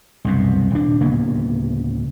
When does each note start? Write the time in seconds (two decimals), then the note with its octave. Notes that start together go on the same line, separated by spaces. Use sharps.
0.25 C2 F#2 B2
0.71 D#1 D4
1.00 D1 C#3 A#3 B3